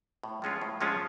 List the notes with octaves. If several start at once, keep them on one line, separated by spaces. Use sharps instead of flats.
A2
F3 G#3 C#4 F4
A2
F3 G#3 C#4 F4